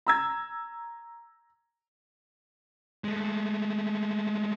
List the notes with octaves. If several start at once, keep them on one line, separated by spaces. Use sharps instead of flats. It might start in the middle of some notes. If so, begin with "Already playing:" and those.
A#5 E6 G#6
G#3 A3